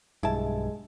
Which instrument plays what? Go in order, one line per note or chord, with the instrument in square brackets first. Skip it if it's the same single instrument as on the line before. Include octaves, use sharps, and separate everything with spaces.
[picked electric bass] B1 G2 [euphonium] G#3 [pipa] E4 A5